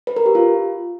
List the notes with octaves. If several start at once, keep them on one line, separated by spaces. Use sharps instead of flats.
B4
A#4
G4
F4